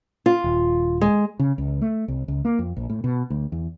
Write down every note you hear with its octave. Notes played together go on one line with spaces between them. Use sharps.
F4
D#1
G#3
C#3
C#2
A3
C2
C#2
A#3
F2
A#1
A2
B2
D2
E2